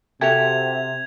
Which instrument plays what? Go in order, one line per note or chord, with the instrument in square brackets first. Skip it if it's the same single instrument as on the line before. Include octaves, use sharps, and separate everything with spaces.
[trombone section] C3 [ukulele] F#4 G4 A4 [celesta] E5 [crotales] G#6 F7